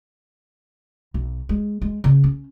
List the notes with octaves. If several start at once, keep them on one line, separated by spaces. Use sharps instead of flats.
B1
G#3
G#3
C#3
C#4